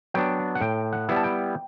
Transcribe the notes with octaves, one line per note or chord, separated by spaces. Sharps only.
F#3 B3 D4 G5
F#5
A2 G5
F#5
G3 B3 E4
A5
G5